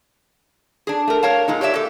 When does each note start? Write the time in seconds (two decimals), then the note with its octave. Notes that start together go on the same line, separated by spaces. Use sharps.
0.87 D4 G#4
1.08 A3 A#4
1.23 A#4 C#5 F5 A5
1.48 A#2 G#3 D#4
1.61 G4 C#5 D5 E5
1.74 G4 A4